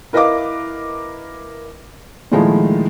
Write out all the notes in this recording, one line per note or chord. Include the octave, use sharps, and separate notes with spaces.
E4 A#4 B4 D#5 F5 D6
A#2 D#3 F3 G#3 A3 E4